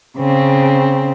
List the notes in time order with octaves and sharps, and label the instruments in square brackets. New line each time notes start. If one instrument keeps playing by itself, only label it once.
[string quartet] C#3 C4